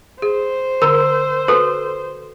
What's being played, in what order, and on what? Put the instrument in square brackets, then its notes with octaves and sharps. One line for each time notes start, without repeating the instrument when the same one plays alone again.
[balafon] G#4 [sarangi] C5
[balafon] D3 A#5 [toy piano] A#4 [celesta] E6
[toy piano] F#4 A4 [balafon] B4